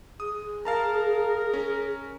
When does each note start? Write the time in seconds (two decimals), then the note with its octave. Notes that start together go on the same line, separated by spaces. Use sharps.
0.20 G#4 D#6
0.65 A#4 F5 A5 A#5
1.53 C#4